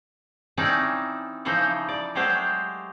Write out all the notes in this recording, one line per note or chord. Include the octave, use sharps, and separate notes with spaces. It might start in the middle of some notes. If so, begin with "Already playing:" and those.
E3 C4 C#4 D#4 D5 A5
C#3 E3 F3 D#4 C5
D5
F#3 G#3 A3 G4 C5